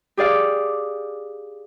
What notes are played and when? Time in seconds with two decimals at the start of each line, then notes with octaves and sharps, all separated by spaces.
0.17 G4 G#4 D5 F5